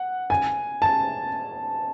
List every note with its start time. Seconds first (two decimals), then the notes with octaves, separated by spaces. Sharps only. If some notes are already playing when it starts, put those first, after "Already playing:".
Already playing: F#5
0.30 G#5
0.82 A5